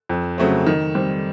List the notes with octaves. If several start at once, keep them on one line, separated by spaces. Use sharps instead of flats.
F2
C#3 F#3 A3 C4
D#3
G3 C4